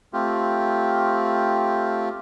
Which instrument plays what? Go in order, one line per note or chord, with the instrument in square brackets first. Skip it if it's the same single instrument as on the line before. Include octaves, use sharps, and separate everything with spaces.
[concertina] A3 C4 F4 G4